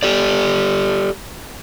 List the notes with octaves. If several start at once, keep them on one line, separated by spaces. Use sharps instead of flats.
G4 A4 D5